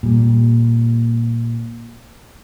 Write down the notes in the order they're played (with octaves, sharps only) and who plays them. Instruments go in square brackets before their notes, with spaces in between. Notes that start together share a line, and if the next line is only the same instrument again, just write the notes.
[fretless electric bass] A#2 G3